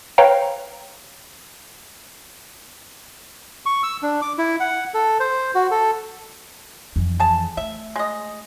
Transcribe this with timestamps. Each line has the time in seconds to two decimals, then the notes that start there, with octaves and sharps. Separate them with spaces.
0.18 B4 C#5 F5 G5 A#5
3.66 C#6
3.83 E6
4.02 D4
4.22 D6
4.38 E4
4.60 F#5
4.94 A4
5.20 C5
5.55 F#4
5.71 A4
6.96 F2 E3
7.20 G#4 A5
7.57 A3 E5
7.96 G#3 D#5